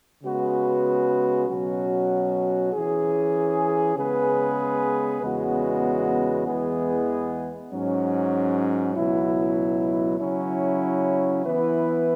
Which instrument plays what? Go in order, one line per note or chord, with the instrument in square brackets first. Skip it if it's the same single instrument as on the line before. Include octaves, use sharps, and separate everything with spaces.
[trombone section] C#3 G#3 B3 F#4 B4
B2 F#3 C#4 F#4
E3 C#4 G#4
C#3 G#3 B3 G#4 B4
E2 C#3 G#3 B3 F#4
E2 E3 G#3 B3 G#4
G#2 F#3 C#4
C#2 B2 F#3 E4
C#3 F#3 C#4 E4
E3 B3 E4 B4